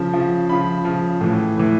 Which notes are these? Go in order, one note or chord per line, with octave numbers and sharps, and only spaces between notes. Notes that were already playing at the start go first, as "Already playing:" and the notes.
Already playing: C#3 F3
C#3 F3
C#3 F3 B5
C#3 F3
A2 E3
A2 E3